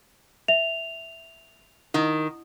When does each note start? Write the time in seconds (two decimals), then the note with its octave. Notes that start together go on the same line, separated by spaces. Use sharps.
0.48 E5 F7
1.94 D#3 E4 F#5